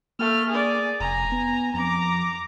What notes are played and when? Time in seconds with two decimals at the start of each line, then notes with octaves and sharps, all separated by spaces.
0.19 A3 A#3 F6
0.49 G#4 D5
1.00 F1 G#5 A#5
1.32 B3
1.74 F2 A#5 D6